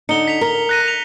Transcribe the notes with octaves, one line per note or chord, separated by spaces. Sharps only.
D3 D#4 C#7 G7
B6 F7
A#4
F#6 A#6 D#7
F7